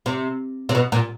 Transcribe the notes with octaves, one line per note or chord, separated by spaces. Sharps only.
C3
C3
B2
A#2